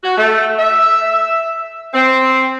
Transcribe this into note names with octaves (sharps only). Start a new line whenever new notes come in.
F#4
A3
E5
C4